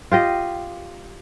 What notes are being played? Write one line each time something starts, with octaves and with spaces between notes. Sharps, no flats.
F4 G4 D#5